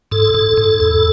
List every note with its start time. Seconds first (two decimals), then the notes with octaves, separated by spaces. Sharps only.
0.12 G#2 A4
0.34 G#2
0.57 G#2
0.80 E2